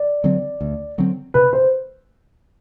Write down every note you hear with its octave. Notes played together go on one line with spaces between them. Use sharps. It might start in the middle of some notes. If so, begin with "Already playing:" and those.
Already playing: D5
D3 F#3 C4
D2
D3 F#3 C4
C3 B4
C5